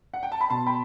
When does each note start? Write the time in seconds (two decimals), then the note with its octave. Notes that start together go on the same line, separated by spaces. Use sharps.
0.13 F#5
0.23 G5
0.32 A5
0.41 B5
0.50 B2 A5 C6
0.66 G5 B5